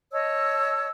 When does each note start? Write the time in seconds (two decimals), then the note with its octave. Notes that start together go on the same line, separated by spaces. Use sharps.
0.12 C#5 D#5 A5 E6